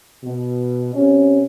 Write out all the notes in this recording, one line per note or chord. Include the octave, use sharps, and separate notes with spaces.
B2
C3 C#4